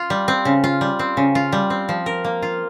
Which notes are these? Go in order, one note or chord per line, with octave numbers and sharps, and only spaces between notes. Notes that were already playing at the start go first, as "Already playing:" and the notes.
Already playing: F4
G3
C4
C#3
F4
G3
C4
C#3
F4
G3
C4
F3
A#4
A#3
F4